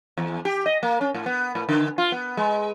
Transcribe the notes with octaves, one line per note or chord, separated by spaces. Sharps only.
E2
G4
D#5
A#3
C#4
A2
B3
A2
D3
F4
B3
G#3